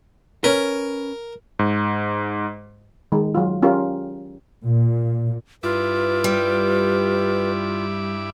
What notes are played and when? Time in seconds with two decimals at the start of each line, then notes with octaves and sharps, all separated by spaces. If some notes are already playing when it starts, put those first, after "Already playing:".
0.44 C#4 A#4 B4
1.59 G#2
3.12 D#3 G#3
3.35 F#3 F4
3.62 C#4 F4 G4 A#4
4.63 A#2
5.63 G2 E4 F4 B4 D6
6.24 G3